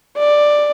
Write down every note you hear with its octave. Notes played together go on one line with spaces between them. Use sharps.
D5